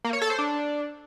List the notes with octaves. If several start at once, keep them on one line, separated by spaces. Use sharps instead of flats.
A#3
C#5
A4
C5
D4